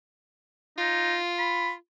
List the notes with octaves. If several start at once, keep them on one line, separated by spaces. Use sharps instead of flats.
D#4 F4
B5